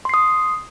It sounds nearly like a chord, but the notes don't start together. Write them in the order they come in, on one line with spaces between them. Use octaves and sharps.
C6 C7 D#6